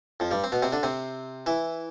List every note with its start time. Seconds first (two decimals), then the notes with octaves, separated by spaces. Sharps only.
0.20 F2 F3
0.31 G2 G3
0.44 C4
0.52 B2 B3
0.63 C3 C4
0.73 D3 D4
0.83 C3 C4
1.46 E3 E4